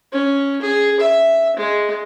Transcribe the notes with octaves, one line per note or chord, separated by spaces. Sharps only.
C#4
G#4
E5
G#3